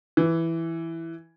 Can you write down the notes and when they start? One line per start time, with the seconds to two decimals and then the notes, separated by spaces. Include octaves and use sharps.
0.17 E3